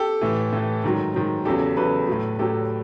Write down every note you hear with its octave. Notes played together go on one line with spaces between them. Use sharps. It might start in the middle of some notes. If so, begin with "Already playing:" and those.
Already playing: G4 A4
A2 E3
A2 E3
G#2 D#3 F#3
G#2 D#3 F#3
E2 C#3 F#3 G4 A4
E2 C#3 F#3 A4 B4
A2 F#3
A2 F#3 G4 A4